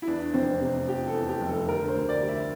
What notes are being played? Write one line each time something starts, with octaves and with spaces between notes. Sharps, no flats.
E4
E2 D4
F1 C4
C3
F3 G4
A4
E2
G4
F1
A4
D3 A#4
C5
D2
D5
G3
E5